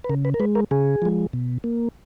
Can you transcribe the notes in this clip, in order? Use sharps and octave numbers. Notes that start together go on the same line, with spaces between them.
B4
C#3 A#4
B4
A#4
G#3 B4
A#4
C#3 G#4
F3 G#3
B2
A#3